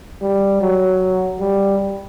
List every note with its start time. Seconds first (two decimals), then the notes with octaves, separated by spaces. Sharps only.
0.22 G3
0.61 F#3
1.40 G3